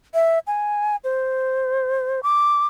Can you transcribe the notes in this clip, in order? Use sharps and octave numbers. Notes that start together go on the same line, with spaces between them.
E5
G#5
C5
D6